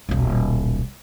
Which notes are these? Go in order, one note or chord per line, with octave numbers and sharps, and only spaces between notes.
D#1 B1